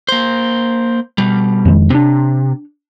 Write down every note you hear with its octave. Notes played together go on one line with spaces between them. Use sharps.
A#3 C5
B2 G3
F2 D#3 G#3
C3 C4 D4